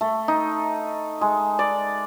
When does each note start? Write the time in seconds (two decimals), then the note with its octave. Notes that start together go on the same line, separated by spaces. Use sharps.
0.01 A3
0.28 D#4
1.21 G#3
1.59 D5